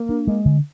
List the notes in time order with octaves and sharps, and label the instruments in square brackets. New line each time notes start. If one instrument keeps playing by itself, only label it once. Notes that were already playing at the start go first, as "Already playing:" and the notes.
Already playing: [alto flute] A#3
[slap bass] D4
G#3
D3